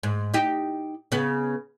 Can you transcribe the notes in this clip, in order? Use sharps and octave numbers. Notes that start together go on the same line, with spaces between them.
G#2
D#4 G4
C#3 B3